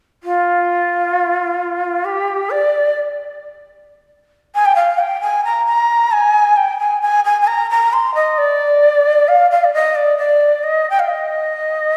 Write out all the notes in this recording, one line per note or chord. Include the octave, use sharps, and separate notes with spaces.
F4
G4
D5
G#5
G5
F5
G5
G#5
A#5
A#5
G#5
G5
G#5
G#5
G#5
G#5
A#5
A#5
C6
D#5
D5
F5
F5
D5
D#5
D5
D5
D#5
G5
F5
D#5